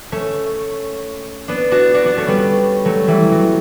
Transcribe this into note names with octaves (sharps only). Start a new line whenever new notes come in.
A3 C#4
B3 D4
D4 F#4
D4 F#4
B3 D4
A3 C#4
G3 B3
F#3 A3
E3 G3
F#3